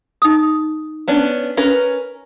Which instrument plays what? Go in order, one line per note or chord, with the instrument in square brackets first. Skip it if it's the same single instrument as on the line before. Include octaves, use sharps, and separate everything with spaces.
[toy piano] D#4 D#6
[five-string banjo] B3 C#4 D4
C#4 A#4 B4